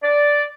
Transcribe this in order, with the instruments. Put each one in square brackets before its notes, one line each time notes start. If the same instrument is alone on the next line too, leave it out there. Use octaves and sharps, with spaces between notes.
[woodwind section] D5